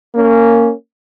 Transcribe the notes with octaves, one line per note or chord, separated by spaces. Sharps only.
A#3 C#4